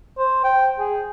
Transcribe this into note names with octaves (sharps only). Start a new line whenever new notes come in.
C5
G5
G#4